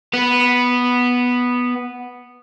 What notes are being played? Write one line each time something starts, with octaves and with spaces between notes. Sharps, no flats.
B3 B4